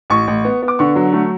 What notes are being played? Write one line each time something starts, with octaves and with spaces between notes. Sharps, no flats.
A1 C#6
A1
B3
B3
D6
D3 C#6
F#3
A3